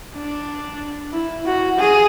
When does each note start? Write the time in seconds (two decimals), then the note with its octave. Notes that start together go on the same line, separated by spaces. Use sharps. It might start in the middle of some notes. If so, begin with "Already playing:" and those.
0.15 D4
1.13 E4
1.45 F#4
1.78 G#4